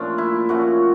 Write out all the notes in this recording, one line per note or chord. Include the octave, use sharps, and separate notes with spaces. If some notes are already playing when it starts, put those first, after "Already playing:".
Already playing: A#2 F3 A3 C#4 D4
E4
A#2 F3 A3 C#4 F#4